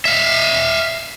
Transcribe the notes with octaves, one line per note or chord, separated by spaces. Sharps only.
E5 F5